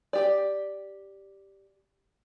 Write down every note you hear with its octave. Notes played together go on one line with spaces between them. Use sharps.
G4 D5